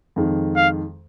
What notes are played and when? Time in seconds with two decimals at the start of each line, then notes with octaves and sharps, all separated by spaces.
0.16 F2 D#3 G#3
0.56 F5